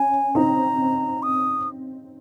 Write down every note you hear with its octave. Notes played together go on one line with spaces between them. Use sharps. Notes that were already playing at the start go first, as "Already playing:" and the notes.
Already playing: C#4 G#5
C4 D#4 A#5
D#6